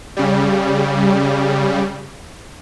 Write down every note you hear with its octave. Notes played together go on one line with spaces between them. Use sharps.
C#3 G3